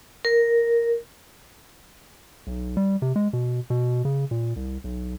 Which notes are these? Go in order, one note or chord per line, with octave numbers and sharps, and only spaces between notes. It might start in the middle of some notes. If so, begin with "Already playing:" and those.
A#4
B1
G3
C3
G#3
B2
B2
C#3
A#2
C2
B1